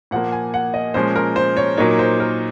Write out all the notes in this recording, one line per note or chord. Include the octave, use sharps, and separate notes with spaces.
A#2 F3 A#3 F#5
G#5
F#5
D#5
A#2 F3 G#3 C#4 C5
A#4
C5
C#5
A#2 F#3 A#3 D#4 C#5
C5
A#4